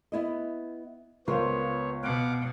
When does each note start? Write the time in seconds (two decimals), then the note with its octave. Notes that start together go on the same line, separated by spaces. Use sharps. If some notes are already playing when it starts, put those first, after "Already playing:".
0.12 B3 E4 D#5
1.28 C#2 B3 F4 A#4 C5 C#5
2.04 B2 F5 F#5 D6